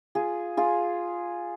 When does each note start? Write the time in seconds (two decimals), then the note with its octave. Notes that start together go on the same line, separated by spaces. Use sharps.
0.15 F4 G#4
0.57 F4 G#4